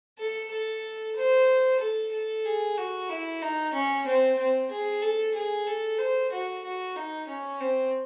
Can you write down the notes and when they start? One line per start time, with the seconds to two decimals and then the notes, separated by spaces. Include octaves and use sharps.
0.19 A4
0.51 A4
1.16 C5
1.80 A4
2.13 A4
2.45 G#4
2.78 F#4
3.09 E4
3.42 D#4
3.73 C#4
4.06 C4
4.38 C4
4.71 G#4
5.02 A4
5.35 G#4
5.67 A4
5.99 C5
6.32 F#4
6.64 F#4
6.96 D#4
7.28 C#4
7.60 C4